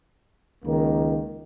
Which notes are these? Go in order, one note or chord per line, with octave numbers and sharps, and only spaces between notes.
C#2 D#3 A#3